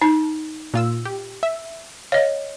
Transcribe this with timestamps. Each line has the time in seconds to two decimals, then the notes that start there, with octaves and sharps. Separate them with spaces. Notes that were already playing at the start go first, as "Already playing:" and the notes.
0.02 D#4 A5
0.74 A#2 F4 E6
1.05 G4
1.43 E5
2.12 C#5 D#5 F5